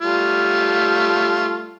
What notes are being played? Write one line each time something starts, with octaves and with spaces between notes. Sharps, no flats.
G3 A3 F4